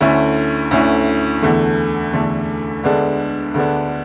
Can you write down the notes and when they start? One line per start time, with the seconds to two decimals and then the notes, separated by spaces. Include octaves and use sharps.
0.01 D2 D3 A3 C#4 E4
0.71 D2 D3 A3 C#4 E4
1.42 E2 D3 A3
2.14 E2 D3 A3
2.84 D2 D3 G#3 B3 D4
3.54 D2 D3 G#3 B3 D4